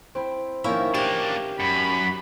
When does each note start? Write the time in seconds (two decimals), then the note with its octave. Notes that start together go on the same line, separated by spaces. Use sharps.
0.15 C4 E4
0.64 D#3 F3 A#3 C#4 E4 E5
0.95 A#3 D4 G4
1.60 F#2 B5